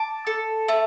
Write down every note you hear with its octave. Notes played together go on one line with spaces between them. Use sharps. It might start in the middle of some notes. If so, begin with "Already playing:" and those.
Already playing: A5 D6
A4
A3